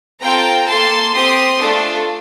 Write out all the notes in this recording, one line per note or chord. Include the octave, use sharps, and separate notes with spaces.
C4 F4 A4 G5 A#5
A#3 F4 A4 A5 C6
C4 G4 C6 D#6
A3 D4 F4 A4